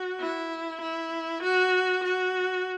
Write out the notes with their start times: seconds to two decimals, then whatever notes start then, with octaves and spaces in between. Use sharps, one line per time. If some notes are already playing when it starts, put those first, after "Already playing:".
Already playing: F#4
0.20 E4
0.81 E4
1.43 F#4
2.03 F#4